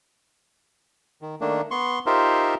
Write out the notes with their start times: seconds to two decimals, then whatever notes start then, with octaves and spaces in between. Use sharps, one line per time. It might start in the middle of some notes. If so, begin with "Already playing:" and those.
1.22 D#3
1.41 D#3 A3 A#3 D4
1.71 B3 C6 C#6
2.06 D#4 F4 G4 A#4 C5 E5